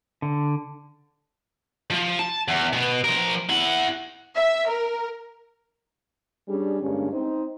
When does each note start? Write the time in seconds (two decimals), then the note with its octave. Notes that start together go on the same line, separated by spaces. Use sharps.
0.22 D3
1.90 F3
2.19 A5
2.48 E2
2.73 B2 B3
3.04 F3 A#4
3.49 E4 F#5
4.36 E5
4.69 A#4
6.49 G3 C#4 D4 G#4
6.82 G2 D3 G#3 A#3 C#4
7.12 C4 D#4